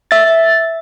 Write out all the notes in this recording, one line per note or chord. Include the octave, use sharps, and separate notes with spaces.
E5 A6